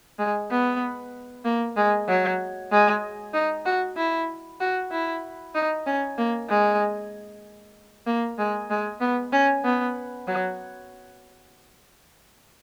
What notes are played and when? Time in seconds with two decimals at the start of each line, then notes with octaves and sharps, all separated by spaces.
0.19 G#3
0.51 B3
1.45 A#3
1.77 G#3
2.09 F#3
2.72 G#3
3.34 D#4
3.66 F#4
3.97 E4
4.60 F#4
4.91 E4
5.55 D#4
5.86 C#4
6.18 A#3
6.49 G#3
8.07 A#3
8.39 G#3
8.70 G#3
9.01 B3
9.32 C#4
9.64 B3
10.27 F#3